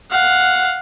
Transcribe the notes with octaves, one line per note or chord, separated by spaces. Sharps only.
F5 F#5